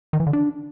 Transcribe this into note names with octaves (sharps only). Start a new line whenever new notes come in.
D#3
E3
D3
D4